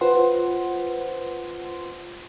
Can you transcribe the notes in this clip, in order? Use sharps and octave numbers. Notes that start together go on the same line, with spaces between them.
F4 B4 C5 F#5 C6